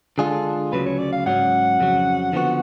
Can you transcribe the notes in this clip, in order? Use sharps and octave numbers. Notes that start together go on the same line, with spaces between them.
D3 G#3 D4 F4 G#4 A4
D2 C#3 F#3 B4
C#5
D5
F5
G#2 F#3 C#4 F#5
F2 C#3 F#3
D3 F3 B3 F#4